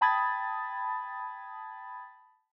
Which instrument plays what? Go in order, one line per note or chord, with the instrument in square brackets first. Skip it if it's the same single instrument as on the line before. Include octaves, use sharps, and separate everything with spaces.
[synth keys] G5 A5 B5 D#6 G#6 A6